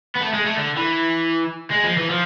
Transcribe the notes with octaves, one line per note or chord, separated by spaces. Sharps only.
B3
A3
G#3
A3
D3
E3
G#3
F3
E3
F3